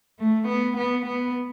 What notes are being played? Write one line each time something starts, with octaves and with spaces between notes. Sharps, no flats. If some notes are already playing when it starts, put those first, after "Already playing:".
A3
B3
B3
B3